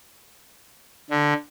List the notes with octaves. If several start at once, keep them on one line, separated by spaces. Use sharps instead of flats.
D3